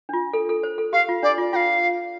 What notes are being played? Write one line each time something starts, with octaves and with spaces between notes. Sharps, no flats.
D4
F4
A4
A4
C5
A4
G4 F5
F4
D4 D5
F4
F4 F5 G5